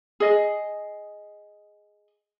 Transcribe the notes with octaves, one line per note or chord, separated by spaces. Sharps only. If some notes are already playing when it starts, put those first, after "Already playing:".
G#4 D#5